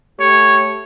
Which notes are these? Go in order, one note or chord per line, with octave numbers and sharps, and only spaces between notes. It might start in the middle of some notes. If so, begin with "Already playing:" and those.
A3 G4 C#5